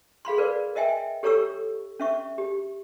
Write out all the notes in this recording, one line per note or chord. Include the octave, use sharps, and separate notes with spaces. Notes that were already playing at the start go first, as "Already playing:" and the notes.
G#4 F5 B5 C6
A#4 B4 D5
A#4 D#5 E5 G5 G#5
G4 A4 C#5 A#5 C#6 E6
C#4 E5 C#6
G4